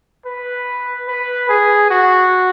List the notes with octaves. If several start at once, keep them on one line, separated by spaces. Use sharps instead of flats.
B4
B4
G#4
F#4